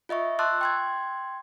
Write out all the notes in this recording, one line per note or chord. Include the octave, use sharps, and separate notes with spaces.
F4 D#5 E5 C#6
A5 C6 D6 E6 F#6 A6
G5 C6 G#6